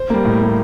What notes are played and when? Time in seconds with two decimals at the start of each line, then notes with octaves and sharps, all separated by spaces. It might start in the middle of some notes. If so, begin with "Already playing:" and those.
Already playing: C5
0.10 G3 A#3
0.25 A2
0.41 G3 A#3